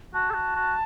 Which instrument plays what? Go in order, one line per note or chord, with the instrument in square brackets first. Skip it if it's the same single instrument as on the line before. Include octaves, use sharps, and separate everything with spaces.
[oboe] F#4 [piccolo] A5
[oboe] A4
F#4
F#4